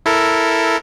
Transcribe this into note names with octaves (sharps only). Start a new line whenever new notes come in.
E4 A4 A#4